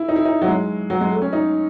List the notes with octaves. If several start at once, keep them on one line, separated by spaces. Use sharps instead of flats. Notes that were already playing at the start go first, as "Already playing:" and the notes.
Already playing: E4
D#4
E4
D#4
F#3
G#3
F#3
G#3
A3
C#4
D#4